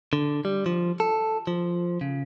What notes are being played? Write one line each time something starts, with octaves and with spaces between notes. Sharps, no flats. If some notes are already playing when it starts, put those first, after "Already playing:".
D3
G3
F3
A4
F3
C#3